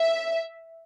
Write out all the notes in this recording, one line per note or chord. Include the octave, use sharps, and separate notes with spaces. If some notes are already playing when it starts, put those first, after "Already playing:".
Already playing: E5